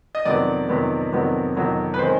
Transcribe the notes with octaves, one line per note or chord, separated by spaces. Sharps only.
D#5
F2 C3 D#3 F#3 B3 D5
F2 C3 D#3 F#3 B3
F2 C3 D#3 F#3 B3
F2 C3 D#3 F#3 B3
B4
C3 D#3 G#3 C#4 C5